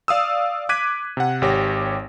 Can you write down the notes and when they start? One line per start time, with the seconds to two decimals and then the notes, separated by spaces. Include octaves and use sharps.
0.08 D5 F5 D#6 E6
0.69 D6 F#6 G#6 B6 D#7
1.17 C3 F#5
1.42 G#1 G4 C#5 A#6